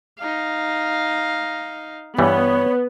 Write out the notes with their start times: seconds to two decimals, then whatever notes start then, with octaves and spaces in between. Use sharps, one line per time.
0.19 D#4 F5
2.19 G2 E3 G3 B3 C#5